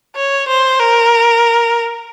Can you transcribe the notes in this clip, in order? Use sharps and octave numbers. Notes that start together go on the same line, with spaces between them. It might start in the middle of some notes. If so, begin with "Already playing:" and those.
C#5
C5
A#4